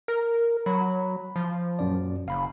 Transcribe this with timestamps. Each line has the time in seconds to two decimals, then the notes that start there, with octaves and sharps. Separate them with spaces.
0.08 A#4
0.66 F#3 B5
1.36 F3
1.79 A#1 F#2 D5
2.28 F#1 F5 B5